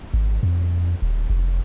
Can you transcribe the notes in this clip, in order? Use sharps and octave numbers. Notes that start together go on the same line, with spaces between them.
G#1
F2
D#1
F1